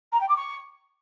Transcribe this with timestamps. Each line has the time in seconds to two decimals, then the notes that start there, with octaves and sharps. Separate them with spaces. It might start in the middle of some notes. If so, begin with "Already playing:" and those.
0.12 A#5
0.20 G5
0.28 D6
0.36 C#6